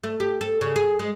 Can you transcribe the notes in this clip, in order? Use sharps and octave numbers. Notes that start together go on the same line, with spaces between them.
A3
G4
A4
C#3
G#4
G#3